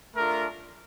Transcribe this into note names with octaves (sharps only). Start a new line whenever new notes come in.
A3 D4 F4 A#4